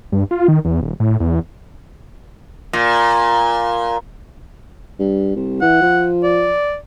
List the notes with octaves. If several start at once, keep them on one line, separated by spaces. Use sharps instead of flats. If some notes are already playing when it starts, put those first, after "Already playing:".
G2
F4
D#3
E2
D#1
A2
E2
A#2
G2
C2
E3 F#5
F3
D5